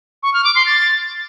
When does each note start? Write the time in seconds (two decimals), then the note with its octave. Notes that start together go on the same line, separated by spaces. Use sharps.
0.23 C#6
0.34 F6
0.44 D6
0.55 C6
0.66 A6